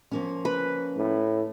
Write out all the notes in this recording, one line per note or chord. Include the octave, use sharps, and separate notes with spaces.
F3 A#3 C#4
B4
A2